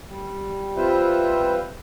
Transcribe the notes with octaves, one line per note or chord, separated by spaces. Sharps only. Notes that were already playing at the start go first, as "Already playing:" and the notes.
G3
G3 C4 F4 B4 C5 E5